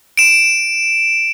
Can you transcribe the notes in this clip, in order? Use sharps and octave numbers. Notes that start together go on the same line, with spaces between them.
D7 E7